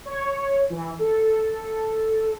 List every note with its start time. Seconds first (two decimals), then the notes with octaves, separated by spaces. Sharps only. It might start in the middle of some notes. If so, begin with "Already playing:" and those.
0.05 C#5
0.70 E3
0.99 A4